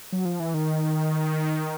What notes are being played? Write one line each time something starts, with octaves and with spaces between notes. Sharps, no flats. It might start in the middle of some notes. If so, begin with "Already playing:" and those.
F#3
F3
E3
D#3